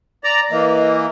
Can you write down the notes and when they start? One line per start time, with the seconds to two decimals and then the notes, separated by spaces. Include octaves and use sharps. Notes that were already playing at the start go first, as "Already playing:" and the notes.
0.24 D5 A#5
0.51 E3 A#3 D#5